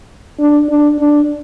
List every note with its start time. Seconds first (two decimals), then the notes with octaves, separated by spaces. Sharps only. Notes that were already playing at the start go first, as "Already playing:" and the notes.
0.39 D4
0.69 D4
1.00 D4